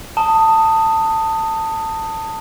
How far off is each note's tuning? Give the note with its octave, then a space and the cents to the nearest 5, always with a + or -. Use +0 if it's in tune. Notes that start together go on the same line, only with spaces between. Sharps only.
A5 +20 D#6 +0